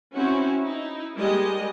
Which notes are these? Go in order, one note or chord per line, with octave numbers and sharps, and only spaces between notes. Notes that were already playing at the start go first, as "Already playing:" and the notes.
C4 C#4 E4 F#4
D#4 E4
G3 G#3 A#3 D#5